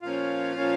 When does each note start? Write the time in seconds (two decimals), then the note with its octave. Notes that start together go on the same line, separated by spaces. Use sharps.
0.02 A#2 F3 A#3 C#4 F4 F5
0.55 A#2 F3 A#3 C#4